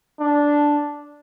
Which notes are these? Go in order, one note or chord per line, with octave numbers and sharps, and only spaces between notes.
D4